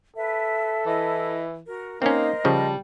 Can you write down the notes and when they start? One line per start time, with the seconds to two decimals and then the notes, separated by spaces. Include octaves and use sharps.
0.16 A4 B4 E5
0.86 E3 E4 D#5
1.67 F#4 A#4
2.02 A#3 C4 C#4 D#4 A#4 C5 D#5
2.45 C#3 F3 G3 A5